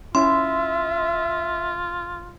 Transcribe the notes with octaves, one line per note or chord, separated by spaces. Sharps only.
C#4 E4 F4 E5 C6